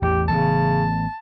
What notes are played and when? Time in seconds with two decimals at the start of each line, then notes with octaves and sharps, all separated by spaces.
0.02 A1 E2 A2 G4
0.29 A1 C#3 E3 B3 A5